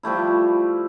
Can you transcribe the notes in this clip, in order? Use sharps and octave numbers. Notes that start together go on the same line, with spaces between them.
F3 G3 A3 E4